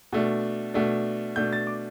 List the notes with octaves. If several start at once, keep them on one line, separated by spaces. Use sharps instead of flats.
B2 A3 D4
B2 A3 D4
B2 A3 D4 G6
A6
D6